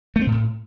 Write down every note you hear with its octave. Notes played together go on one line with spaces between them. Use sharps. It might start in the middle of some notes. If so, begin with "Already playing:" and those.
A3
C4
A#2
A2